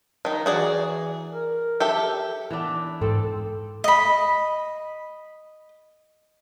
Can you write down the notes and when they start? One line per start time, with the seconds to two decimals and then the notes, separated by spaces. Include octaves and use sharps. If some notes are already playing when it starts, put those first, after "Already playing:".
0.25 D#3 D#4
0.46 E3 F#4 G#4 D5
1.31 A#4
1.80 G4 A4 E5
2.51 E3 B3 D4
3.01 G#2 C4 A4
3.84 D#5 B5